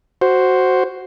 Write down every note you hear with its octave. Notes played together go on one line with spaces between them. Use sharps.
F#4 C5